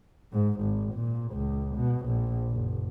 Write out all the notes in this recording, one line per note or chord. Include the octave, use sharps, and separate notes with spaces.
G#2
G#1
A#2
C#2
B2
A#1
F#1